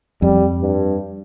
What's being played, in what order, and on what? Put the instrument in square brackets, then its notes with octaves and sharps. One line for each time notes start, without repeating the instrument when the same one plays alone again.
[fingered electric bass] F2 [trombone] G3
[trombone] G2